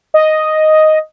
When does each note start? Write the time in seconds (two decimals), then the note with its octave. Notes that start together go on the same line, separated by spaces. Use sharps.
0.14 D#5